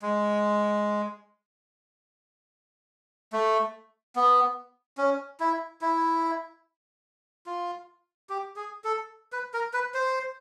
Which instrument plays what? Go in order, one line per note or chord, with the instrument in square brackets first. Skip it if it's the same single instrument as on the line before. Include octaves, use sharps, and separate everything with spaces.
[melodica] G#3
A3
B3
C#4
E4
E4
F4
G4
G#4
A4
B4
A#4
B4
C5